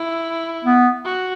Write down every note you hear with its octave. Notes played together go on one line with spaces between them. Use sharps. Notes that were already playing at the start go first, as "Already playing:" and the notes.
Already playing: E4
B3
F#4